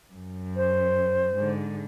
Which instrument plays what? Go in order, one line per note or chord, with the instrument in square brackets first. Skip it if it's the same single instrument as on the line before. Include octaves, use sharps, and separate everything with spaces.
[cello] F#2
[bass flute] C5
[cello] G#2 D3